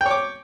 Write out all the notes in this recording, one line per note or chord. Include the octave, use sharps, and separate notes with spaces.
C#5 G5 D6